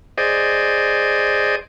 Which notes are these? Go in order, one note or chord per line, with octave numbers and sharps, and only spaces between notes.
G#4 C5 D5 D#5